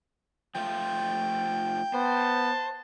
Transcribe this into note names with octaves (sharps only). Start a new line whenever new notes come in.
F3 A3 F4 G5
B3 C5 A5